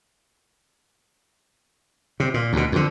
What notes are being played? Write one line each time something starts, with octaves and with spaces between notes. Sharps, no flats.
C3
A#2
D2 B2
F2 D3